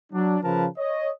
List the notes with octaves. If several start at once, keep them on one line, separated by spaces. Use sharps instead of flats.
F#3 D4
C#3 F3 A#4 B4 A5
C#5 D#5